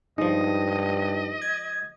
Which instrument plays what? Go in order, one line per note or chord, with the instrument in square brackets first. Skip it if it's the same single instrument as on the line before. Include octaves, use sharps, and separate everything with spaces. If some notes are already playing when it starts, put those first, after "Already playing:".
[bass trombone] G2 [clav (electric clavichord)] F3 G#3 [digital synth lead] D#4 [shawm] D#5
[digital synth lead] G#6